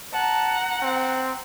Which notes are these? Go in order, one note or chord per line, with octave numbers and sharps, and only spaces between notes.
F#5 A5 A#5
C4